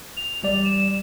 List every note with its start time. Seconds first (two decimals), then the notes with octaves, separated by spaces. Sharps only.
0.17 F7
0.43 A1 G3 D5
0.64 E7